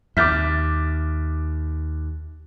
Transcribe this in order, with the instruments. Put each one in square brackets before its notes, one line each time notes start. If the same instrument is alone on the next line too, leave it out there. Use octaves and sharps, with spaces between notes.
[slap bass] D#2 [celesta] E5 F6 G6 [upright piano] D6 A6 B6